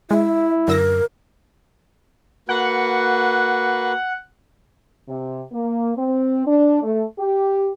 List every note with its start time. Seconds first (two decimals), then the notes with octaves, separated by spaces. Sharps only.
0.11 G#3 E4 E5
0.68 F#2 D3 A#4 E6 A#6
2.49 A#3 F#4 B4 F#5
5.08 C3
5.52 A#3
5.97 C4
6.46 D4
6.83 A3
7.18 G4